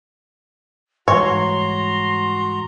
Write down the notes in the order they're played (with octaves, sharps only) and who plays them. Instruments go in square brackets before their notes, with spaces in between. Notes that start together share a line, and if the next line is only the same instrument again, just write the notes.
[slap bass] G#2 E3 G3 [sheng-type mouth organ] F#4 A#5 [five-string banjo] C#5 [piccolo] C6